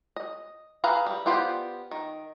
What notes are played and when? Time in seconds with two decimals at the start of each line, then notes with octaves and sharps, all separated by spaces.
0.16 D#5
0.84 G#4 B4 E5 F5 A#5
1.06 G3
1.26 B3 F4 G4 C5 D5
1.91 D#3